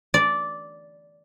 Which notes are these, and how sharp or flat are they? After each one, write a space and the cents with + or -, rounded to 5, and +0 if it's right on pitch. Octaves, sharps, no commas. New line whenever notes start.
D5 -10